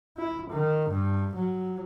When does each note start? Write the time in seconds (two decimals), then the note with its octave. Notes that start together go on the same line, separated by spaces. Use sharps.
0.17 E4
0.50 D#3
0.89 G2
1.35 F#3